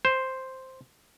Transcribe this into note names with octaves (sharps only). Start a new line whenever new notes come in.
C5